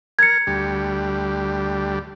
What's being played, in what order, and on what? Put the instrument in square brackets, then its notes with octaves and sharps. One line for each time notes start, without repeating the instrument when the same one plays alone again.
[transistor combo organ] A#4 [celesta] G#6 C#7
[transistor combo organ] D2 G3